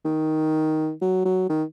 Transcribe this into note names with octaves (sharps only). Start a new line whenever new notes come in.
D#3
F#3
F#3
D#3